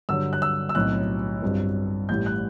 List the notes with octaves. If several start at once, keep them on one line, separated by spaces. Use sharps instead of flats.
G2 D3 F#3 E6
F#6
E6
E6
B1 A2 F#3 C4 F#6
G1 G2 F#3 C4
A1 A2 G3 G6
F#6